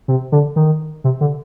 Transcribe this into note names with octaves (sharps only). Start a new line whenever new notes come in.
C3
D3
D#3
C3
D3